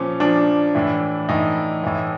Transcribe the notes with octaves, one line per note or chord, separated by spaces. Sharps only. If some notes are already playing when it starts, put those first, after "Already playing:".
Already playing: A#2 F3 C#4
A#2 F3 D4
A2 E3
A2 E3 D#4
A2 E3